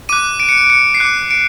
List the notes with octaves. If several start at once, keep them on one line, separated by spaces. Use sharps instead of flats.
D6 F#6 D#7
D7
C#7
D7
C#7
C7
D6 F#6 C#7
D7